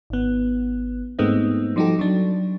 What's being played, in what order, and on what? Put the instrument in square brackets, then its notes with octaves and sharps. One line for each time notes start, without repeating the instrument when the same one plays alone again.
[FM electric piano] G#1 B3
G#2 G#3 A3 B3 C4 D#4
F3 G3 D#4 F#4 G4 A4
F#3 D4